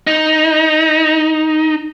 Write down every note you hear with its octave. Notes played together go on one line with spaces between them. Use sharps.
D#4